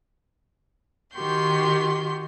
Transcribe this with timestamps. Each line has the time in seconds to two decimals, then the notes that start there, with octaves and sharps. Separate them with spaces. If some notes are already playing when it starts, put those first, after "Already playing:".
1.14 D#3 F#4 G4 C6 G6